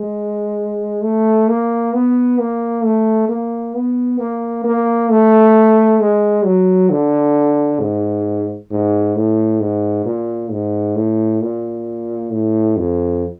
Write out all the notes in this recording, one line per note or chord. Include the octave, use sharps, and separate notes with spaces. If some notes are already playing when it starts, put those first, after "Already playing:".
Already playing: G#3
A3
A#3
B3
A#3
A3
A#3
B3
A#3
A#3
A3
G#3
F#3
D3
G#2
G#2
A2
G#2
A#2
G#2
A2
A#2
A2
F2